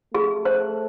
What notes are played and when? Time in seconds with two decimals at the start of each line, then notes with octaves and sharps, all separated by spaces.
0.14 A3 G#4
0.45 C5